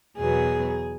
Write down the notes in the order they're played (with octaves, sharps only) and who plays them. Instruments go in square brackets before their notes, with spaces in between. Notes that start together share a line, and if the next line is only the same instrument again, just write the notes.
[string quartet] E2 B2 F#3 B3 G#4